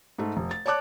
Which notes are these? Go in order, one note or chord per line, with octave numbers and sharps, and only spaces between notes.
G#2 A3
F1
A6
C#5 D5 A5 D6 F#6